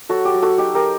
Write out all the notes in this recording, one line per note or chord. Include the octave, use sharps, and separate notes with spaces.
F#3 F#4 A4
G4
F#3
F#4 A4
D#4 G4
G4 A#4